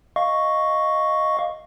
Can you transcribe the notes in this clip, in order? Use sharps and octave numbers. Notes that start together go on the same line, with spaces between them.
D#5 F5 C#6